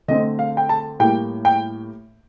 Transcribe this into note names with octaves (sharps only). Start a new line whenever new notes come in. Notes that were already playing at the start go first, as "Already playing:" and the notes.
D3 A3 C4 D#5
F5
G5
A5
A2 G3 A#3 G5
G5